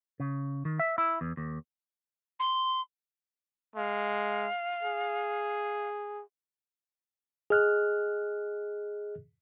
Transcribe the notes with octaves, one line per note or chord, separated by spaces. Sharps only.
C#3
D#3
E5
E4
E2
D#2
C6
G#3 F5
G#4
G#4 D#5 F6 F#6